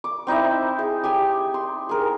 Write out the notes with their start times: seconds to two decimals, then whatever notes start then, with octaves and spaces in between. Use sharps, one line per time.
0.04 D6
0.27 C4 D#4 E4 E5
0.79 G#4
1.04 G4 G5 G#5
1.54 C6
1.89 G#4 A#4